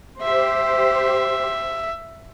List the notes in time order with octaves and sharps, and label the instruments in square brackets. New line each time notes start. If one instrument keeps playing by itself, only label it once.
[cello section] G4 C5 [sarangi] E5